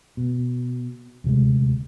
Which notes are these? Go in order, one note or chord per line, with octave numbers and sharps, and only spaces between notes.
B2
D#1 D2 C3 G#3